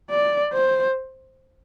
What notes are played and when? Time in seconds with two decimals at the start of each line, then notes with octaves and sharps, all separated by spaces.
0.10 D5
0.53 C5